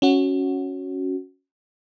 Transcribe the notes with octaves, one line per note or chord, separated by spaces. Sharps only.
C#4 F#4